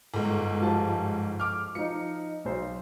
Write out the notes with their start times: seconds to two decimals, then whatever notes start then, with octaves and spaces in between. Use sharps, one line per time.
0.14 G1 G#2
0.61 F3 G4 A5
1.40 D6 F6
1.75 F3 D#4 C#7
2.45 B1 C5